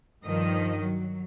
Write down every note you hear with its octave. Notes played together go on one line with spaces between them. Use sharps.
G2 D#3 F3 D#5
F#3